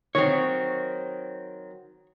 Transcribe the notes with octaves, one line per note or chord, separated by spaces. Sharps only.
D#3 F#3 C4 C#5